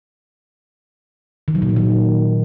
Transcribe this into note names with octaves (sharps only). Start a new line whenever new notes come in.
D#3
F#3
A#2
F#3
D#3